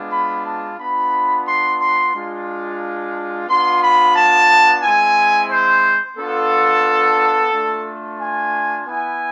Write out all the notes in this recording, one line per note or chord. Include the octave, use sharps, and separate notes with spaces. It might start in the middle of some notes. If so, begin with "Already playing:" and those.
Already playing: G#3 B3 D4 F4
B5
A5
B3 D4 F4 B5
C6
C6
G#3 D4 F4
B3 D4 F4 C6
B5
A5
G#3 C4 E4 G#5
C5
B3 D4 F4 A4
A3 D4 F4
G#5
B3 E4 G#5